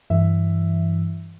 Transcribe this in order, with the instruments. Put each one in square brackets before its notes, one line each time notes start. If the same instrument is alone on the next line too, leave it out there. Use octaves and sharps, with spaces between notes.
[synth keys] G2 E3 E5